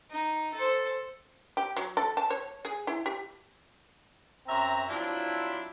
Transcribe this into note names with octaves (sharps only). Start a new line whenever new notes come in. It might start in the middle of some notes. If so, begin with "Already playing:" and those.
D#4
A4 C5
G4
F#3
A4
A5
C#5
G#4
E4
G4
F#2 C4 C#5 E5 A#5
F3 F#3 C4 D4 E4